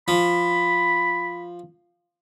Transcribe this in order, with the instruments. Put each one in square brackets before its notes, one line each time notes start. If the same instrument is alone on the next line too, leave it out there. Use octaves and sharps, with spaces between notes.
[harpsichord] F3 [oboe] B5